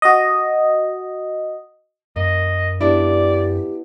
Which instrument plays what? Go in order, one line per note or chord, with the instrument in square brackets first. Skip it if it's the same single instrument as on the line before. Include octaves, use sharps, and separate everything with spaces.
[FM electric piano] F#4 D#5
[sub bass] F#2 [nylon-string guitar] A#3 [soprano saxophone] D#5
[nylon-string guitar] B3 D4 E4 [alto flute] G4 [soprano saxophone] D5